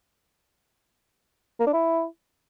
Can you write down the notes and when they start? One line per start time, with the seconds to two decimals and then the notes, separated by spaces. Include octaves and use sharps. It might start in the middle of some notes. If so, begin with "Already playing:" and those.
1.60 A#3
1.67 D4
1.73 E4